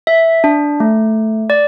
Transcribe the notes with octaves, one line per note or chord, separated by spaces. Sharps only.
E5
D4
A3
D5